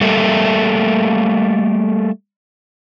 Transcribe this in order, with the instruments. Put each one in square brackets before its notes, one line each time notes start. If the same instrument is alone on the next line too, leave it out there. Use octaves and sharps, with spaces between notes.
[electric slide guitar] G3 A3 A#3 A4 E5